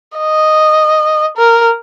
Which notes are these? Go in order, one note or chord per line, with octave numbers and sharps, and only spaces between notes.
D#5
A#4